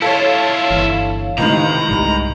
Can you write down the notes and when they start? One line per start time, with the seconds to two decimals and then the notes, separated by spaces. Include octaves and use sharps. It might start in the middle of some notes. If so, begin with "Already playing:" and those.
0.02 E4 F4 A4 C#5 F5
0.70 G1 E3
1.38 C#2 A2 C3 D#3 A#5
1.89 C2 G#2 G3